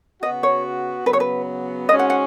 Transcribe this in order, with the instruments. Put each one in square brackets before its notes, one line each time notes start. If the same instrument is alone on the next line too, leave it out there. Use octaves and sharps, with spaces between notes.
[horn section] C#3 B3 F#4 [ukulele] D#5
[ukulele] C#5
[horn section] C#3 F#3 B3 [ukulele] B4
[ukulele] C#5
B4
[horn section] G#2 G#3 C#4 F#4 [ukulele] D#5
[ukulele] F#5
F#5